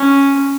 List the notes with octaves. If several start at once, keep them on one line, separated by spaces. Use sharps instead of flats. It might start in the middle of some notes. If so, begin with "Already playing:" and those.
Already playing: C#4